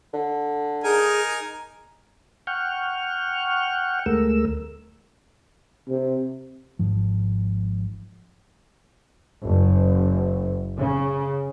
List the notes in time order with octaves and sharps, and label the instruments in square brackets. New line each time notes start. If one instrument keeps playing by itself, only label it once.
[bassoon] D3
[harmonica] D#4 A#4 G#5 [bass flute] G#4
[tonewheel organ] F#5 G5 C#6 F6
D2 G#3 A3 A#4 E6
[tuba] C3
[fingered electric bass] G#1 G#2 F3
[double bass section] F#1
C#3